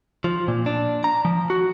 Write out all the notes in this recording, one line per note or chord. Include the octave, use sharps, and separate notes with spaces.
F3
A#2
D4
A#5
F3
F#4